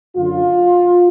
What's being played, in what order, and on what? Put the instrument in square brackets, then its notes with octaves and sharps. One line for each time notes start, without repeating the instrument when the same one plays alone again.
[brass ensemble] F#2 D3 F#3 F4